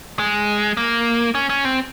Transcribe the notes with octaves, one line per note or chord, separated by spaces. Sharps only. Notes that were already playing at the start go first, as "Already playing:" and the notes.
G#3
A#3
C#4
C#4
C4